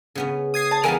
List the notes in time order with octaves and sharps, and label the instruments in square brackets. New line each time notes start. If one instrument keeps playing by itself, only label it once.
[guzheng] C#3 B3 C#4
[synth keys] D#6 G#6 C7
[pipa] A5
[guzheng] E2 G3 B3 [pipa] A#4 F5 [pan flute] G#5